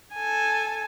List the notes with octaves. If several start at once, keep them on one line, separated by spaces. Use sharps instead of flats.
A4 G#5